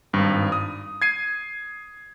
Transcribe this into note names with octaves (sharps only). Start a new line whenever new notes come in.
G#1 G2 G3
D#6
G#6 C7 D#7